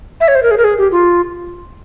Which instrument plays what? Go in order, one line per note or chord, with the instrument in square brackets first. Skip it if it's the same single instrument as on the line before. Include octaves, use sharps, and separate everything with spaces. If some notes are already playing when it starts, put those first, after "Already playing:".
[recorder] E5
C#5
C5
A#4
G#4
A#4
G#4
G4
F4